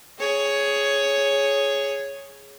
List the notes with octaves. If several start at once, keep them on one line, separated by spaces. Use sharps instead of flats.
G#4 C#5